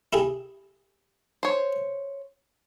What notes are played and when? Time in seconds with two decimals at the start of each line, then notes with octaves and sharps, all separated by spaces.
0.13 E4 G4 G#4
1.43 C5 C#5